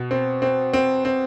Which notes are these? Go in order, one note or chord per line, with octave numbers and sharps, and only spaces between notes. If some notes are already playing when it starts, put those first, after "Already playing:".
Already playing: B2
C4
C4
C4
C4